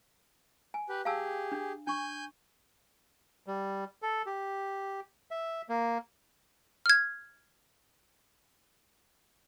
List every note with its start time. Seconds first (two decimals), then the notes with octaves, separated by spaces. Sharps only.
0.74 G#5
0.89 G4 B4
1.05 G4 G#4 F5 A5 E6
1.52 D4
1.87 D4 G#5 C#6 G6
3.46 G3
4.02 A4
4.26 G4
5.31 E5
5.69 A#3
6.86 F6 G#6